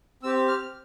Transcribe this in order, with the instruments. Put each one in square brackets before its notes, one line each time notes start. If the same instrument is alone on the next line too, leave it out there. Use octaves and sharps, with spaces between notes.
[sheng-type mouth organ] C4 E6
G4
F6